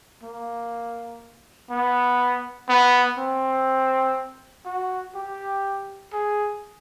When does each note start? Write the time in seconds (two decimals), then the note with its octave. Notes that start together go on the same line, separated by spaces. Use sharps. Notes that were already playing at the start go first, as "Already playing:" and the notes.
0.23 A#3
1.70 B3
2.69 B3
3.18 C4
4.66 F#4
5.16 G4
6.13 G#4